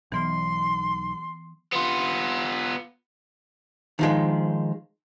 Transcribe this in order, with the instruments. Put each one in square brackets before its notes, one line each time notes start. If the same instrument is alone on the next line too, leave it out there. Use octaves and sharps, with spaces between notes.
[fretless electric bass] B1 [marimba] E3 B3 F6 [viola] C6
[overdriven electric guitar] B3 F4
[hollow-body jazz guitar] D#3 F3 G#3